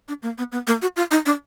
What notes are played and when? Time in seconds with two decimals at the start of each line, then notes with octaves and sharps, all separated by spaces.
0.08 D4
0.23 A#3
0.38 B3
0.52 B3
0.67 A#3
0.82 F#4
0.96 F4
1.11 D#4
1.26 D4